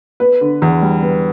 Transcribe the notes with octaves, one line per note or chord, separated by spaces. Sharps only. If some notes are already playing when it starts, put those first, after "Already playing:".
B3 B4
D3
E2
G3
B3